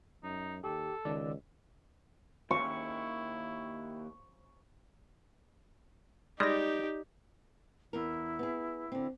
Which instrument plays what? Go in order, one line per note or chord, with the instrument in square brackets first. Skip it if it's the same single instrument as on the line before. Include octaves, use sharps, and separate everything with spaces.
[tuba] F#2 [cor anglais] D#4
[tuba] D#2 [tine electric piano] G4 [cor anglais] A4
[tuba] C#2 [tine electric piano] D#3 D5 E6
[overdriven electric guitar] D#2 [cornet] E4 [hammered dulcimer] C#6
[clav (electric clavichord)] G3 G#3 [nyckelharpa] D#4 G4 [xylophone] D5 A#6
[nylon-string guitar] E2 A#4 [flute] E4
[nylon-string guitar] B3 G#4
D3 C4